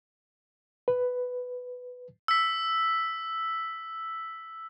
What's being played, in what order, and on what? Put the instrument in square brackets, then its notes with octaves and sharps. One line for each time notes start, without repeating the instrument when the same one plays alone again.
[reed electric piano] B4
[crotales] E6 B6